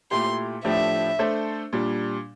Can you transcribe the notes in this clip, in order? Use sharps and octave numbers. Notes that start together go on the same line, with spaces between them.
A#2 A3 E4 G4 C6
A2 F3 A3 D4 G4 E5
A3 D4 A4 C5
A#2 G3 D4